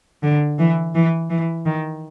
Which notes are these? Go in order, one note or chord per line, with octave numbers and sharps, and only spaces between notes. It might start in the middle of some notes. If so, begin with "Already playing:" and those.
D3
E3
E3
E3
D#3